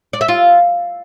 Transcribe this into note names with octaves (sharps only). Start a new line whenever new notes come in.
D5
E5
F4